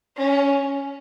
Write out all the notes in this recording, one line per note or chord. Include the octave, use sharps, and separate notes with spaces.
C#4